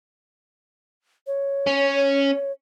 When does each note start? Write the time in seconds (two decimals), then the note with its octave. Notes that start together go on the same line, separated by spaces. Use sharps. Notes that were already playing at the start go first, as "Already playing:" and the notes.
1.27 C#5
1.67 C#4